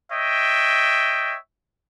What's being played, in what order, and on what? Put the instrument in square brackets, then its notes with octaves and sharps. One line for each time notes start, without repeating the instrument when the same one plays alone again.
[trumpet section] C#5 D#5 E5 G5